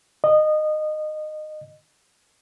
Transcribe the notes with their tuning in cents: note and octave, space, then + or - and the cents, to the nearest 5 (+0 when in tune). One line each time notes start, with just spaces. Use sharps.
D#5 -20